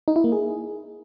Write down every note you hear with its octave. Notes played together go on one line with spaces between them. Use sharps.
D#4
E4
A#3
G#4